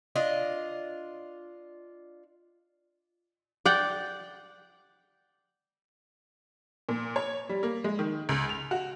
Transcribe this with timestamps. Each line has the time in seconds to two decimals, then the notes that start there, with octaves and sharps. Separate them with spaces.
0.16 D4 F4 D#5
3.65 D5 F#5 G5
6.89 A#2
7.16 C#5
7.49 G3
7.63 A#3
7.84 G#3
7.99 D#3
8.29 C#2
8.49 F7
8.71 F#4